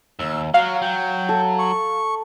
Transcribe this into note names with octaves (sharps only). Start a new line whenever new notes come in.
D#2 E6
F#3 F#4 F5
F#3 G5
A4
C#6